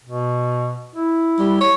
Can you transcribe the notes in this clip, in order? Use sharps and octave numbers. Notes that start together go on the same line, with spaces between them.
B2
E4
G3
C#5